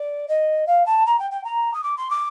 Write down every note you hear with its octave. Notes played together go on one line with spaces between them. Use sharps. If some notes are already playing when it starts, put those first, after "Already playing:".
Already playing: D5
D#5
F5
A5
A#5
G5
G5
A#5
D#6
D6
C6
D6